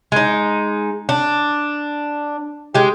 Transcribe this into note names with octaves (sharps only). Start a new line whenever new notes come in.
G#3 D#4
D4
G#3 G4